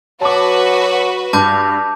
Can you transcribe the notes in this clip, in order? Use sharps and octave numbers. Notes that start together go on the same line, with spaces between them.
F#3 F#4 B4 A5 D6
G2 A5 D6 G6